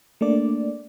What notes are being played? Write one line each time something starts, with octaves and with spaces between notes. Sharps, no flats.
A3 A#3 D4 D5